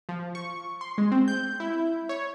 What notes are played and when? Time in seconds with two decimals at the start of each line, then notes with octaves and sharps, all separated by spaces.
0.09 F3
0.35 C#6
0.81 C6
0.98 G#3
1.12 C4
1.28 G6
1.60 E4
2.09 C#5